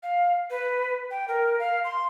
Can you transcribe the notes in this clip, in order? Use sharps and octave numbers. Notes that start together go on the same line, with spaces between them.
F5
B4
G5
A#4
F5
C6